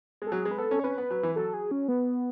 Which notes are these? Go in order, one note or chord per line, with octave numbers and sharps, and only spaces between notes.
G#3 A4
F#3 G#4
G#3
B4
B3 A4
C#4
C#5
C#4 B4
B3
F#3
E3
F#3 A4
G#4
C#4
B3